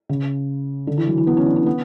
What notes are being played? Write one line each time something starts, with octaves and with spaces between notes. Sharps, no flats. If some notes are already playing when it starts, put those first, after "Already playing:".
C#3
D3
E3
F#3
E3
B3
C#4
D4
C#4
B3